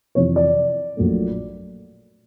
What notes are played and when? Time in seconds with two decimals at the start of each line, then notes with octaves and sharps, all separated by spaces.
0.15 F2 C3 E3 C#5
0.36 D5
0.97 A#1 A#2 F#3 A3